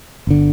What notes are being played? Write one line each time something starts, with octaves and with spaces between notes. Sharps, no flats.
G1 D3